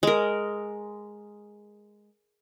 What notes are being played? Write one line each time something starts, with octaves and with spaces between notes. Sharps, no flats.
G#3 A#4